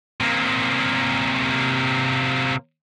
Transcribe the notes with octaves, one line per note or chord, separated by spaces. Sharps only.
C3 A#3